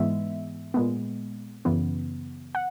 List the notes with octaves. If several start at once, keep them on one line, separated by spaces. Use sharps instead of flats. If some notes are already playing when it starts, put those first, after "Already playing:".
Already playing: G#2 E3 G#3 B3 E5
A#2 G#3 B3
F#2 C#3 E3 B3
F#5